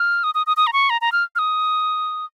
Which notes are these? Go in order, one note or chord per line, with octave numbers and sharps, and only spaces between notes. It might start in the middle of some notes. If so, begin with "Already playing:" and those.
Already playing: F6
D#6
D#6
D#6
D#6
A#5
C#6
A#5
A#5
F6
F6
D#6